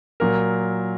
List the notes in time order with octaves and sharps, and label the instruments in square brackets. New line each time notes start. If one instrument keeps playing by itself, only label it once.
[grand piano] A#2 F#3 A#4